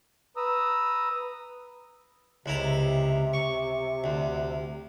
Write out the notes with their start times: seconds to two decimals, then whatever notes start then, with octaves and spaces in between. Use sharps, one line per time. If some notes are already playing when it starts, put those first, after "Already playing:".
0.37 B4 A#5 D#6 E6
2.46 C#2 C3 E4 A#5
3.33 C#6
4.04 D2